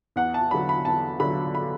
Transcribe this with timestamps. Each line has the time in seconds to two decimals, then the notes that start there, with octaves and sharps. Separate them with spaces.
0.16 E2 F#5
0.34 A5
0.51 D3 F#3 B5
0.69 B5
0.85 E2 A5
1.20 D3 F#3 B5
1.55 B5